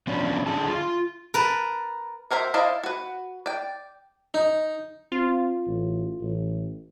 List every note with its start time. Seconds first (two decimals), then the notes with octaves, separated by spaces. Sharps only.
0.07 F3 B3 C#4 D4
0.47 D3 D4 F#4 G#4 A5
0.68 F4
1.34 A#4 B4 A5
2.31 F#4 A#4 C5 C#5 E5
2.54 E4 C5 D5 D#5 F5
2.84 F#4 B4
3.46 D5 G5
4.34 D#4
5.12 C4 F4
5.67 A1
6.21 A1